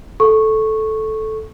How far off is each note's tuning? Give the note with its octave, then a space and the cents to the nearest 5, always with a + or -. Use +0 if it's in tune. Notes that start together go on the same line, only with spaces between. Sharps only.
A4 -10 C#6 -10